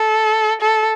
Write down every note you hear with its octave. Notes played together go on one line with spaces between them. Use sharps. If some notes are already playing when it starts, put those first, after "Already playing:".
Already playing: A4
A4